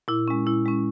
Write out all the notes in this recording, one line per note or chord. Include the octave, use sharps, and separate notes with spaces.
A#2 E4
G#3 C#4
A#2 E4
G#3 C#4